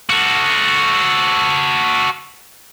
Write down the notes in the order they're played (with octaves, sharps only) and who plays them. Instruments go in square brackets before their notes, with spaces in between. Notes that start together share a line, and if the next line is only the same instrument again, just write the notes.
[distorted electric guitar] F#4 A4